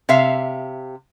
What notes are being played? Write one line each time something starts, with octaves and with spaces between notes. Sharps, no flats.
C3 E5 F5